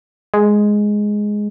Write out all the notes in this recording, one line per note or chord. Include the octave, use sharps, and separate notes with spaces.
G#3